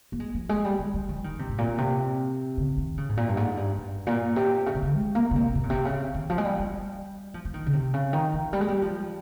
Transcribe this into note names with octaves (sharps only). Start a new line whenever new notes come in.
A#3
G#3
F3
G#3
G3
F3
G3
F3
D#3
C3
G#2
A#2
C3
C#3
D#3
C#3
G#2
A#2
G2
G#2
G2
G2
A#2
C3
C#3
C3
C#3
G#3
A#3
C#3
C3
C3
A#2
C3
C#3
D#3
F3
G#3
G3
G3
F3
F3
D#3
C#3
C3
C#3
D#3
F3
G3
G#3
G3
F3